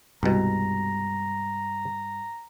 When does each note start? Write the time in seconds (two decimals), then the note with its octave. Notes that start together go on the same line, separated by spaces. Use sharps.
0.23 C2 G2 B2 G#3 A#5